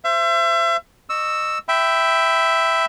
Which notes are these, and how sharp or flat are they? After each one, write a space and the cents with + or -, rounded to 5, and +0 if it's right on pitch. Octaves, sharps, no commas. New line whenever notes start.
C5 +0 E5 +35
D#5 -25 C#6 +0 E6 +0
E5 +0 G5 +0 B5 +25